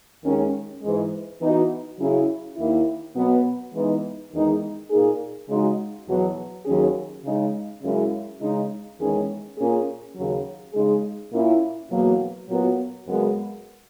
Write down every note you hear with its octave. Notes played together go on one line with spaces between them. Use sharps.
D#2 D#3 G#3 C#4
G#2 E3 G#3
E3 B3 D#4 F#4
C#3 F#3 C#4 E4 G#4
D#2 D#3 A#3 E4
B2 F#3 B3
E3 G#3 B3 D#4
E2 D#3 G#3 D#4
A#2 A#3 D#4 G#4
C#3 G#3 D#4 F#4
E2 B2 F#3
D#2 D#3 F#3 C#4 G#4
C#3 G#3 D#4
F#2 C#3 G#3 C#4 E4
C#3 G#3 D#4
E2 D#3 G#3 C#4 G#4
A#2 A#3 C#4 G#4
D#2 C#3 F#3
C#3 G#3 D#4 G#4
A#2 A#3 C#4 E4
E2 B2 F#3 A#3
A#2 F#3 B3 F#4
F#2 C#3 G#3 B3